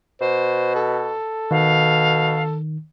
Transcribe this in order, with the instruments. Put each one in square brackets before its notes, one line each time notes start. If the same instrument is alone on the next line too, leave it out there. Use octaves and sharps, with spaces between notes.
[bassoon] B2 [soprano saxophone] C5
[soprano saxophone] A4
[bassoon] B2 [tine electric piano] D#3 [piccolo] F5